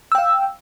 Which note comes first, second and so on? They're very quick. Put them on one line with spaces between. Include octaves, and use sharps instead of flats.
E6 G5 F5